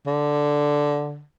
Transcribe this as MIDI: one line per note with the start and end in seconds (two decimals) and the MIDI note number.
0.07 1.22 50